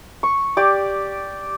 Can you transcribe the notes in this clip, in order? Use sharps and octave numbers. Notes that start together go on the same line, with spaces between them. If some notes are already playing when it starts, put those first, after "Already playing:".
C#6
G4 D5